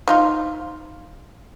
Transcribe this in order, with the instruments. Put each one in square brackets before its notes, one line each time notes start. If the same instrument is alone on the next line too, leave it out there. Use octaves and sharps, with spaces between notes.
[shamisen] F3 D#4 F4